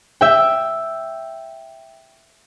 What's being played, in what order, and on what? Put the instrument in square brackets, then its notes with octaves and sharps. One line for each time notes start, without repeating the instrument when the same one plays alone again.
[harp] E5 G5